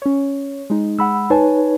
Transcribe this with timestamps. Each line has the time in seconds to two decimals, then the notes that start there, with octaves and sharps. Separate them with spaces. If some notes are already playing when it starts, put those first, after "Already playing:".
0.02 C#4 C#5
0.70 G#3 D#4
0.99 G#3 F#5 B5 E6
1.30 D#4 B4 C#5 G#5 A5